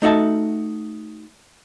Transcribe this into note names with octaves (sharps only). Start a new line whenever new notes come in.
A3 D#4 F#4 E5 A5